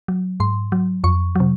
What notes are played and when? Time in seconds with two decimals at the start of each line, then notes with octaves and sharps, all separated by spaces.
0.08 F#3
0.40 G#2 C6
0.72 F#3
1.04 F2 C#6
1.35 C3 F#3